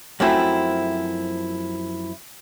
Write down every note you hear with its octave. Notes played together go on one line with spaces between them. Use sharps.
F#2 F3 A3 C4 E4